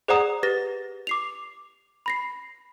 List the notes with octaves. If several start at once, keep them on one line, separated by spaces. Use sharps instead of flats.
G#4 C5 D5 F#5 A#5 D#6
G4 B4 A6 A#6
D6 C7 F7
B5 A#6 C7